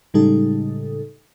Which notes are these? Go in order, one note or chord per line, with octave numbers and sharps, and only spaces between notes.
A2 C#3 G3 G#3 D#4 A4